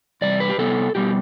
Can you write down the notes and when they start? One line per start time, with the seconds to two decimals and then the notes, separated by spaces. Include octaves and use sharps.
0.21 E2 C3 G3 D5
0.40 B4
0.49 G4
0.58 C3 G3 B3 A4
0.95 B2 G3 B3 G4